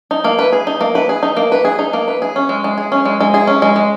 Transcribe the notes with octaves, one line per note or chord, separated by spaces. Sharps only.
D#4
A#3
B4
G#4
D#4
A#3
B4
G#4
D#4
A#3
B4
G#4
D#4
A#3
B4
G#4
C#4
G#3
G#3
G#4
C#4
G#3
G#3
G#4
C#4
G#3
G#3